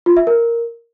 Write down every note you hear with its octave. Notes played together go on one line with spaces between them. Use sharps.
F4
E5
A#4